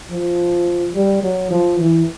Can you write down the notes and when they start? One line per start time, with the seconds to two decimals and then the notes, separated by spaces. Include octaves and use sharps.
0.11 F3
0.95 G3
1.23 F#3
1.50 F3
1.79 E3